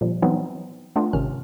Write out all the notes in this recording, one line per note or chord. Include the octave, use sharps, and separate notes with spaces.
A#2 D3 F3 G3
E3 F#3 B3 C4 D#4 E4
A3 B3 D4 F4
G#1 C3 D#3 C#4 F6